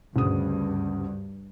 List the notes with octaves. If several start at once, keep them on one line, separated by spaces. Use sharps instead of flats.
D2 G2 C#3 D#6